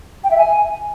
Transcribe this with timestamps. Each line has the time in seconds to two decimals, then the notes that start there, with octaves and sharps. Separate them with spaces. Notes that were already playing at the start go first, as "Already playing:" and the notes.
0.24 G5
0.31 E5
0.38 G#5